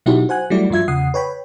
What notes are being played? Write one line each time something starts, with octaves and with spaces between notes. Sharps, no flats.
B2 F#3 D#4 E4 F#4 G4
C5 F#5 G#5 F#6
F#3 G3 A3 E4 F#4 D5
G2 F3 F4 E5 G#6
E2 C#3 F#5 D#6 C7
B4 C#5 G5 B5